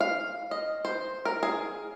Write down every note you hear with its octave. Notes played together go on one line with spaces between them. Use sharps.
F5
D#5
C5
A#4
G#4